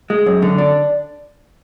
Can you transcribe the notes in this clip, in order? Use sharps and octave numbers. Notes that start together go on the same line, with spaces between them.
G#3
F#2
D3
D4